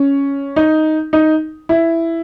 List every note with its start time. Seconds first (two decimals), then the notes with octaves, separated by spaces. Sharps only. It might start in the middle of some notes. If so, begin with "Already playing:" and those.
Already playing: C#4
0.56 D#4
1.13 D#4
1.69 E4